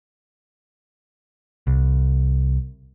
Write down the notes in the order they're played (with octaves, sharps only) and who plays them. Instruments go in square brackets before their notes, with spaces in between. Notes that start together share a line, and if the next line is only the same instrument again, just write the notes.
[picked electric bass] C2